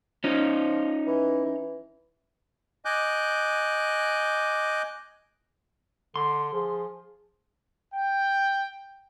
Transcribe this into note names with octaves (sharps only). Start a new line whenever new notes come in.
F3 C#4 D#4
E3
E3
D#5 G#5 D6 F#6 G6
D3 C6
F3 G#4
G5